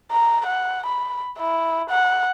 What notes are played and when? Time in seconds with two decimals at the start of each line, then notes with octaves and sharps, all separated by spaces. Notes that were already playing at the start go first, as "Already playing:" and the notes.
0.12 A#5
0.46 F#5
0.86 B5
1.39 E4
1.90 F#5